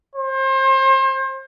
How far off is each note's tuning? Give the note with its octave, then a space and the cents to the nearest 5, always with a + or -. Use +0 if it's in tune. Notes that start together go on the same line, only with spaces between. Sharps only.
C5 +35